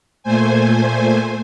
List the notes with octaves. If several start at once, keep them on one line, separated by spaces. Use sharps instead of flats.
A#2 A3 C5 G#5